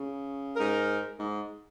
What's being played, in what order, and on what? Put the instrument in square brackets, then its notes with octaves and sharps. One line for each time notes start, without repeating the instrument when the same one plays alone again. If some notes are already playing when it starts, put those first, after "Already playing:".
Already playing: [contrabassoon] C#3
[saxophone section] G#2 G#3 D#4 A#4
[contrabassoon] G#2